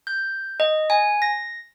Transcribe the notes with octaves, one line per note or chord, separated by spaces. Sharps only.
G6
D#5
G#5
A#6